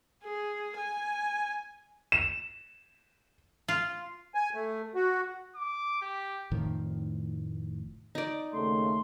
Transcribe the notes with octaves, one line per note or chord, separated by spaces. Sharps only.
G#4
G#5
E7
F4
G#5
A3
F#4
D6
G4
F1 A2 D#3 F3
D#4 D5
D#2 C#3 A3 C6